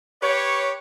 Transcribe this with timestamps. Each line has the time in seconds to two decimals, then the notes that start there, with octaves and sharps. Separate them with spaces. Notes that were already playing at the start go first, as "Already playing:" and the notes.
0.22 G4 B4 C#5